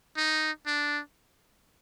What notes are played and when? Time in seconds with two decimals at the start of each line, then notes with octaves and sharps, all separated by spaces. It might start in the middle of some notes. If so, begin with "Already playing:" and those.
0.17 D#4
0.66 D4